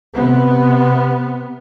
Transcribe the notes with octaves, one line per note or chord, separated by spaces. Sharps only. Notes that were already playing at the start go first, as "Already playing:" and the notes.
C3 B3